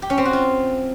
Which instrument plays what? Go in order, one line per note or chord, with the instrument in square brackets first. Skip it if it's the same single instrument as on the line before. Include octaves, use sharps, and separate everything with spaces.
[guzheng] G4
C#4
C4
F#4
F4